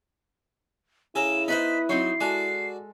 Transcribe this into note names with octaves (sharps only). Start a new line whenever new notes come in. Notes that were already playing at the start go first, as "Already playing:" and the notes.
C#3 E4 A4 G#5 A#5 E7
B3 D#4 B4 C5 D#5 B6
F#3 C4 D#4 C#5 C7
G#3 F#4 A4 D5